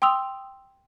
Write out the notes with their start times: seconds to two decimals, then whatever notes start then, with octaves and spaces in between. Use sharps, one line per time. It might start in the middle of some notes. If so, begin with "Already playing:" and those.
0.02 G5 C6 D#6 E6 F7